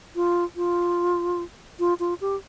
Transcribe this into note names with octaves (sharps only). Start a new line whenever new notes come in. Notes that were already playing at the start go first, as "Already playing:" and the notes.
F4
F4
F4
F4
G4